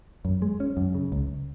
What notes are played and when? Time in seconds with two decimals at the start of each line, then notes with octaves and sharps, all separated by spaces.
0.25 F#2
0.42 G#3
0.60 C#4
0.77 F#2
0.95 C#3
1.12 C#2